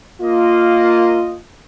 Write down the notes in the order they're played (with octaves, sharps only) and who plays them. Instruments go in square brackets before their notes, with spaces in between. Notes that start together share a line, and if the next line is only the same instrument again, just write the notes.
[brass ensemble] A#3 F4 D#5